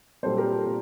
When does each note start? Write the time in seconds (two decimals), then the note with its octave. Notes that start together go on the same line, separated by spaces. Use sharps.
0.23 A#2 G3 C4 A4 C5
0.38 G4 A#4
0.51 A4
0.66 A#2